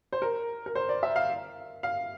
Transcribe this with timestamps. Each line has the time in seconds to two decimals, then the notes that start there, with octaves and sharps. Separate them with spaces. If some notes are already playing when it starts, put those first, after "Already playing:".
0.13 C5
0.22 A#4
0.66 A#4
0.75 C5
0.89 D5
1.03 E5
1.16 F5
1.83 F5